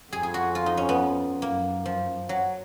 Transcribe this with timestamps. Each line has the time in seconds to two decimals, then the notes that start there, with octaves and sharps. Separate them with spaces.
0.12 F2 G#4
0.23 G#4
0.34 F#4
0.55 F4
0.66 D#4
0.77 C#4
0.89 B3
1.42 F#2 A#3
1.86 F3
2.29 F#3